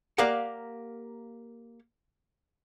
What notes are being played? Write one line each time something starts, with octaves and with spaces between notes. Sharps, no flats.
A#3 G4 A#4 D5 F5 F#5